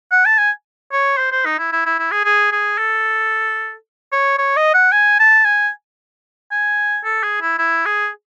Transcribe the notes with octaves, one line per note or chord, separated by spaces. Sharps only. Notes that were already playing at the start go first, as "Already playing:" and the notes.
F#5
A5
G#5
C#5
C5
C5
D#4
E4
E4
E4
E4
G#4
G#4
G#4
A4
C#5
C#5
D#5
F#5
G#5
A5
G#5
G#5
A4
G#4
E4
E4
G#4